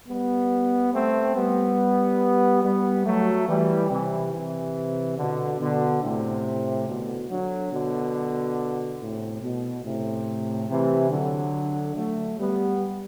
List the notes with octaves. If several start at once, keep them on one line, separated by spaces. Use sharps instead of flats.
G3 B3
A3 C4
G3 B3
G3 B3
F#3 A3
E3 G3
C3 E3
C3 E3
B2 D3
B2 D3
A2 C3
B2 D3
D3 F#3
B2 D3
A2 C3
B2
A2 C3
C3 E3
D3 F#3
F#3 A3
G3 B3